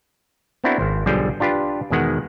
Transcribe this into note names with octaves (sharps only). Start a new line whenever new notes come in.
B3 C4 D4 E4 F#4 A#4
G#1 C5
B1 D3 F3 G3 G#4 G5
D4 F4 G4 B4
E2 B2 D#3 G#3 F#5